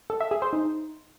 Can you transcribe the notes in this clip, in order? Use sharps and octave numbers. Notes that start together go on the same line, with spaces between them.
A4
E5
G#4
C5
D#4